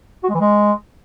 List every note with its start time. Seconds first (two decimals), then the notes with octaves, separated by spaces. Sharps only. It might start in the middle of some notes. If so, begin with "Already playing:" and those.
0.23 F#4
0.29 G#3
0.35 E3
0.40 G#3